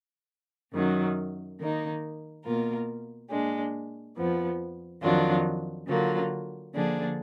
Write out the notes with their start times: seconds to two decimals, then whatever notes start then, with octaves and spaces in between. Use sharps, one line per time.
0.73 F#2 D#3 F#3
1.58 D#3 A#3 D#4
2.44 B2 A#3 F4 A#4
3.29 A#2 G#3 D4
4.16 F2 F3 B3
5.02 F2 D#3 F#3 D4 F4
5.88 D3 F#3 A#3 F4
6.74 D3 F3 A#3 D4 G#4